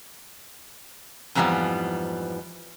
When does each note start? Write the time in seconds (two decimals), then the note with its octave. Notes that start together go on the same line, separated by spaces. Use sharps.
1.35 F2 G#2 E3 F3 G3 B3